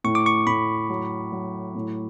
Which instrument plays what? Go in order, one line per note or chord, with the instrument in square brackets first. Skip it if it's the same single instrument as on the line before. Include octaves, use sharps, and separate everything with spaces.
[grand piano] A2 [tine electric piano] C#6
[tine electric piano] D6
C#6
[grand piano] A2 [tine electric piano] B5
[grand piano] F#3
F#3
A2